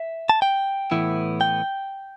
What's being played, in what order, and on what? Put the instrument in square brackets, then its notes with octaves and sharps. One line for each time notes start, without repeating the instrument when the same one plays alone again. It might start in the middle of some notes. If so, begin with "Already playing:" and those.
Already playing: [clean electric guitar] E5
A5
G5
A2 E3 B3 E4
G5